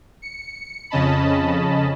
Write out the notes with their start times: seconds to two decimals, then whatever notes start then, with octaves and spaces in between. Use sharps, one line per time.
0.22 C#7
0.90 F2 C#3 C#4 D#5 A5 B5